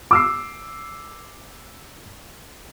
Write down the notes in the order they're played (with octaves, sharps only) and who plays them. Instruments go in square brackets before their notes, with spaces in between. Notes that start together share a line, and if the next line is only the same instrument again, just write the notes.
[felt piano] D6 E6 C7